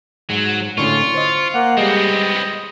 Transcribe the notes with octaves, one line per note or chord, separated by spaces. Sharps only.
G#2 F#3
A2 D3 C#4 F4 C#6
C5 D#5
A#3 F#5
G3 G#3 B3 C4 D#5